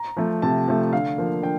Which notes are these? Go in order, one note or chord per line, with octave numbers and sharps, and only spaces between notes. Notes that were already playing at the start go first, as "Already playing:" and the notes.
Already playing: A#5
F3 A3
C3 A5
F3 A3
D3 F5
F3 A#3
D3 G5